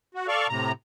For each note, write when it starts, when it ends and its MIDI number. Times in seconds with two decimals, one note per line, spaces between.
0.15 0.27 66
0.28 0.47 69
0.28 0.47 74
0.28 0.47 77
0.28 0.47 85
0.49 0.72 45
0.49 0.72 48
0.49 0.72 82